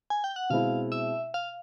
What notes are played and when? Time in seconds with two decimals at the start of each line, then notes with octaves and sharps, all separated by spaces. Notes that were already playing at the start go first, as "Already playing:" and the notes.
0.10 G#5
0.24 G5
0.36 F#5
0.50 B2 G#3 C4 E4 F5
0.92 E5
1.34 F5